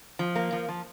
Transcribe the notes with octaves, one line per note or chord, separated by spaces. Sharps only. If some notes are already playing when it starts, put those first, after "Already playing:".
F3
A#3
F3
F3